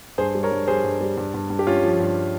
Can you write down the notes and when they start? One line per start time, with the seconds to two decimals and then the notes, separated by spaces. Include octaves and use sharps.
0.18 G2 G#4 C5
0.35 G3
0.43 A#4 C#5
0.52 G2
0.68 G3 G#4 C5
0.84 G2
1.01 G3
1.17 G2
1.34 G2
1.50 G2
1.59 G4
1.67 G2 C#4 F4
1.84 F3
2.00 G2